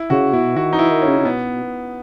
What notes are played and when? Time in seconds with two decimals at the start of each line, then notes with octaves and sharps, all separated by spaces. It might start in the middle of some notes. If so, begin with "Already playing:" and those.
Already playing: E4
0.10 C#3 F#4
0.33 B2 E4
0.56 D#3 F#4
0.73 E3 D#4
0.79 E4
0.91 D#3
1.02 C#4
1.08 C#3
1.21 C#3
1.25 B2 B3